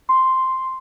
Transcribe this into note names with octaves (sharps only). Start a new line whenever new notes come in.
C6